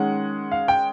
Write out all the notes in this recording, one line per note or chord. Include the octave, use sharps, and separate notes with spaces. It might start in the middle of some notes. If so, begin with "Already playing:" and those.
Already playing: D#3 G#3 C#4 F#5
F5
G5